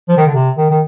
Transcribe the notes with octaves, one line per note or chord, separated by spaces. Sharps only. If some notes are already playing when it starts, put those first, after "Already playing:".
F3
D#3
D3
C3
D#3
D#3